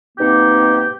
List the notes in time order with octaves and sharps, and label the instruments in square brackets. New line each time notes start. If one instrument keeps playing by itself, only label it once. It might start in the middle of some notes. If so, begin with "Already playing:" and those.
[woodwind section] G#2 B2 A#3 C4 D#4 G4